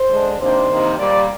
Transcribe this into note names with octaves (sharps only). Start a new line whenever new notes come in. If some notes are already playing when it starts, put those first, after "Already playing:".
Already playing: C5
D3 G#3 D4
C3 D#3 A#3 D4 C5
C3 D#3 A#3
A#2 G3 A#3 D5